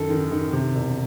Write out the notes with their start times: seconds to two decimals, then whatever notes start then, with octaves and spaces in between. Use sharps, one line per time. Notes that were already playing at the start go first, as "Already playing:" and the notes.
Already playing: F#2 D#3 A4
0.10 D#3
0.31 D#3
0.53 C3
0.75 E1